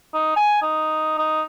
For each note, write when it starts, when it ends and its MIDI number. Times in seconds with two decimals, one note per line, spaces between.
0.14 0.35 63
0.36 0.59 80
0.63 1.14 63
1.18 1.42 63